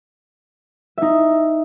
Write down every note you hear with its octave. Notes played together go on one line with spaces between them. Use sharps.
D#4 E5